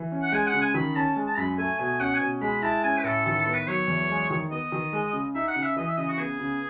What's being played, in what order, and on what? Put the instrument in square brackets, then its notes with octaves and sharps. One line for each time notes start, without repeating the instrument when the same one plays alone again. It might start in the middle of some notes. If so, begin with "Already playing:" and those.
Already playing: [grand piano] E3
C#4
[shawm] F#5
[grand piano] G#3 [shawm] G#5
[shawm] F#5
[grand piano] C#3
[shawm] G#5
[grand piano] D#3 [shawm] B5
[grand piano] C#4 [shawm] A5
[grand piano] G#3
[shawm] A5
[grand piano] F#2 [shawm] B5
[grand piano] A3 [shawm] G#5
[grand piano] B2 [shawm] G#5
[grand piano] C#4 [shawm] F#5
[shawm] G#5
[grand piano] B2
[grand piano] G#3 [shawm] B5
[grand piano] E4 [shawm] A5
[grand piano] C#4 [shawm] G#5
[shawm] B4
[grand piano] A2 [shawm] A4
[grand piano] D#3 [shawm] A4
[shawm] A4
[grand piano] B3
[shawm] B4
[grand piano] F#3 [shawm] C#5
[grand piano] E2
G#3
D#3
[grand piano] B3 [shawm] D#5
[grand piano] D#3
G#3
C#3
[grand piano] D#4 [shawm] E5
[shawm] F#5
[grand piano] C#3
[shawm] E5
[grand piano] E3 [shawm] D#5
[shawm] E5
[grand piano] C#3 [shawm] D#5
[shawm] F#4
[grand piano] B3 [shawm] G#4
[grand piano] C#3